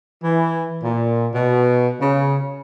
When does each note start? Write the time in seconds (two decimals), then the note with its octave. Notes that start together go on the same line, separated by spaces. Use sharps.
0.23 E3
0.83 A#2
1.34 B2
2.00 C#3